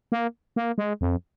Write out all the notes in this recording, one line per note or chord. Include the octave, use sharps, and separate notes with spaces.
A#3
A#3
G#3
F2